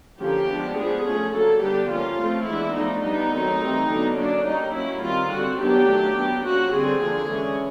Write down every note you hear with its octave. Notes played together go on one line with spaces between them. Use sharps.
D3 F3 A#3 C#4 G4
F3 G#3 B3 D4
F3 G#3 B3 G#4
F3 A3 C#4 G#4
D3 F#3 A#3 A4
D3 G3 B3 D4 G4
F3 A#3 C#4 F4
F3 A3 C4
E3 G#3 B3 D4 E4
F3 A3 D4 D#4
G3 B3 D4 D#4
D#3 F#3 A3 C4
E3 G3 C4
D3 F#3 B3 D4
F#3 A#3 C#4 D4
G3 A#3 C#4 D#4
F#3 A#3 C#4 E4
D#3 G3 C4 F4
D3 G3 C4 F#4
D#3 F#3 B3 D4 G4
F#3 A3 D4
F#3 B3 D4
F3 A#3 C#4 F#4
D3 G3 C4 G#4
D3 F3 A#3 D4
E3 G#3 C#4